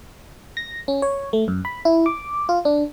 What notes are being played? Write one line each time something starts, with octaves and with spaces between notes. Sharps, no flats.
A#6
C#4
C#5
A3
F#2
B5
E4
D6
F4
D4